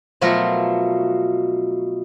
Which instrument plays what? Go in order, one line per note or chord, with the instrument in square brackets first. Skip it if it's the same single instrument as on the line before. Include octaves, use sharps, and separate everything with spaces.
[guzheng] B2 F3 F#3 A3 F4 A#4